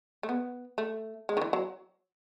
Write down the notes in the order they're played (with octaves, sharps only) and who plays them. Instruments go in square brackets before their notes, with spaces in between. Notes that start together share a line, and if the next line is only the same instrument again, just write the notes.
[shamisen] A3
B3
A3
G#3
D#3
E3
F#3